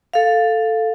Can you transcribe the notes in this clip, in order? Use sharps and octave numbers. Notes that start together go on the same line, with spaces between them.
A4 F5